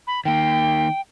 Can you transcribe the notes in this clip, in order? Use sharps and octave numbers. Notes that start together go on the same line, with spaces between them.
B5
D#3 A#3 G5